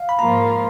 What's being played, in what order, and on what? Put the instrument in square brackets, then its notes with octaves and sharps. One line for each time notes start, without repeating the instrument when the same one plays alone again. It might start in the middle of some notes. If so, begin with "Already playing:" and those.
Already playing: [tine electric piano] F5
B5
[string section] G#2 F3 A#3 F4 [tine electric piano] A#5